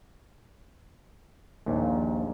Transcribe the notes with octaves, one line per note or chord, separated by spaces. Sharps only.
A#1 D#2 A#2